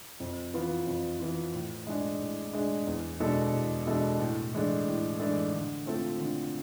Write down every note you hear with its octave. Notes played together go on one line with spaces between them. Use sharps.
F2
E3 B3 F4
F2
E3 B3 F4
A2
G#3 D4 G#4
A2
G#3 D4 G#4
E2
B2 G#3 D4 A4
E2
B2 G#3 D4 A4
A2
E3 G#3 D4 A4
A2
E3 G#3 D4 A4
D3
A3 C4 F4 A4
D3